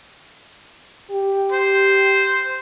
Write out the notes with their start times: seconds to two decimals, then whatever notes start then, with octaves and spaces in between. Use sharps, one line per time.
1.11 G4
1.52 C5